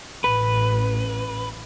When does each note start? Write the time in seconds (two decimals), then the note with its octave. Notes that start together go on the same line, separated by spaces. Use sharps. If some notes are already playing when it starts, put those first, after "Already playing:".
0.24 A1 B4